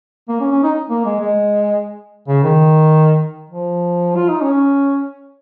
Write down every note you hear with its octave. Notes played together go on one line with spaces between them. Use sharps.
A#3
C#4
C#4
D#4
A#3
G#3
G#3
C#3
D#3
F3
F4
D#4
C#4